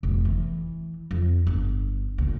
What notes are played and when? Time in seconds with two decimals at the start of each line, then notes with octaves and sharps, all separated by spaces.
0.03 F1 B1
0.25 E3
1.11 F2
1.47 G1
2.18 D2 A#2